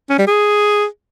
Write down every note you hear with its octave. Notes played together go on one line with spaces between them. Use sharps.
C#4
G3
G#4